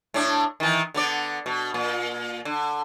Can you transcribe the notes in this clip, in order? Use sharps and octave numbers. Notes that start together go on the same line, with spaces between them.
A2 D4
D#3 E3
D3 B3 D5
B2
A#2
D3